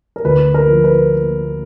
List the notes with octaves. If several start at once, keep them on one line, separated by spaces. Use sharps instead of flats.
A#4
D2 B4
A#4
F3
B4